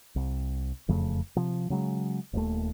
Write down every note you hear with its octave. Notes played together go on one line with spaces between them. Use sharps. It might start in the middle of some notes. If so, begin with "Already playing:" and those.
C2
E1 F2 C#3 A3
C3 F3
C#3 F#3 G#3
D#1 D#2 A3